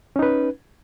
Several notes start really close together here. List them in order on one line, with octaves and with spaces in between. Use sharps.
C#4 D#4 B4